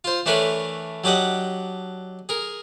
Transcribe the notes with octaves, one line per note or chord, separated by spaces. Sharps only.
F4 C5
E3 A3 D4 A#4 B4 C#5
F#3 D4 G4 D#5 F#5
G#4 A#4